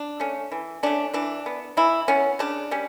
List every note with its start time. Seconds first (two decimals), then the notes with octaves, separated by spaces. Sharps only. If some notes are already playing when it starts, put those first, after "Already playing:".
Already playing: D4
0.20 A3 C#4
0.52 E3
0.83 A3 C#4 D4
1.14 E3 D4
1.46 B3
1.77 E3 E4
2.08 B3 C#4
2.39 C#3 D4
2.71 G3 C#4